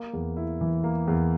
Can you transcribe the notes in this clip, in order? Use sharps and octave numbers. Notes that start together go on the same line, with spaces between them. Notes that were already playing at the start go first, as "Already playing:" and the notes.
Already playing: A#3
E2
E4
E3
A#3
E2